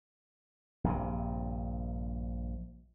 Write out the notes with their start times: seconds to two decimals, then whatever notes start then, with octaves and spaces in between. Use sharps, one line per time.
0.84 A#1 G2 C3